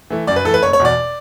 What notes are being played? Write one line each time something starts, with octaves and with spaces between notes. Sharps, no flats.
E3 A3
F#2 D5
B4
E3 A3 A4 B4
F#1 C#5
C#5
E2 B2 D5